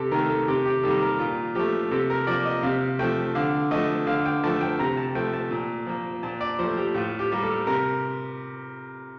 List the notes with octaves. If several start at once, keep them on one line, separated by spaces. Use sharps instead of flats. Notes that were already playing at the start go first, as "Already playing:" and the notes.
Already playing: C3 G4 A4
D#3 A3 A#4
A4
C3 G4
G4
D#3 G3 A#3 A4
A#4
A#2 F4
F3 A3 G4
C3 A4
A#4
F3 A#3 D5
D#5
C3 F5
F3 A3 G5
D3 F5
F3 A3 D#5
D3 F5
G5
F3 A3 A5
G5
C3 A#5
A5
F3 A3 G5
A5
A#2
F3 A#3
A#2 A5
D5
F3 A3 C5
G4
A2 F4
G4
G3 A#3
A4
C3 A#4